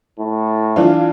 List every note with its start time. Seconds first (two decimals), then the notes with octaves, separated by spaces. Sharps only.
0.19 A2
0.76 E3 D4 F4